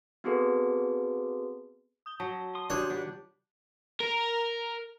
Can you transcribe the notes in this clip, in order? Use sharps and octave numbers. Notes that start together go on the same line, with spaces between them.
B3 C4 F#4 G#4 A4 B4
D#6 G6 G7
F#3 A5
C6 D#6
D4 F#4 G4 C#5 G6
D#3 B3 D4 F4 G4 D6
A#4